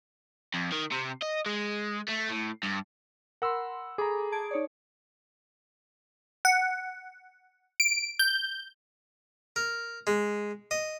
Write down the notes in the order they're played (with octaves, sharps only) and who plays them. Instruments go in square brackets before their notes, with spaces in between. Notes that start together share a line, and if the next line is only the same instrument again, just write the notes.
[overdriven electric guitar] F2
D#3
C3
D#5
G#3
A3
A2
G2
[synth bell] A#4 B5 C6 [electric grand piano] F#5 E6
[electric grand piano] G#4 A#5 [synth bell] A4 B5 D6
[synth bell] A5 G#6 D7
D#4 C#5 D5
[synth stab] F#5
D7
G6
[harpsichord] A#4
G#3
D#5